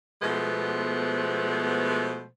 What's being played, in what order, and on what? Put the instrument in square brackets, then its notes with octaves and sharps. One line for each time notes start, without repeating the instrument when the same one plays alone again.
[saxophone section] B2 F3 G#3 A3 B3 C5